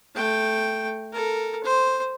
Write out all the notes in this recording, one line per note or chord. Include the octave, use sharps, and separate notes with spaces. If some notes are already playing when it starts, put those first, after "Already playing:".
A3 G5
A4 A#4
C5